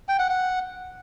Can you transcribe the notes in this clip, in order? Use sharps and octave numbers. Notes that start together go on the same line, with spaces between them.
G5
F#5
F#5